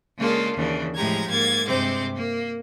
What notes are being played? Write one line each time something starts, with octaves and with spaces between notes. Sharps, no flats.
C#3 G#3 A#3 D4 F4 A4
D#2 C#3 E3 D4
A2 F3 G#3 G4 A#5 G#6
G#2 A#3 G#6 A6
G2 C3 G#3 C4 C5 D6
A#3